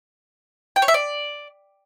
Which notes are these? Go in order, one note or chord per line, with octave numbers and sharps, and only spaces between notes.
G5
C#5
E5
D5